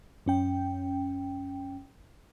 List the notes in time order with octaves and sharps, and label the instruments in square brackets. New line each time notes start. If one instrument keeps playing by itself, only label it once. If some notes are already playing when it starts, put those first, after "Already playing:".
[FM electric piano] F#2 C#4 G5